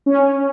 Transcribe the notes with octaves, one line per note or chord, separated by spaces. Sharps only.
C#4